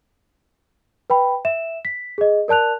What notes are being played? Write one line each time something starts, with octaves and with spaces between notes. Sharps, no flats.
B4 G5 B5
E5 E7
B6
G#4 D#5
A#4 D5 A5 F#6 F7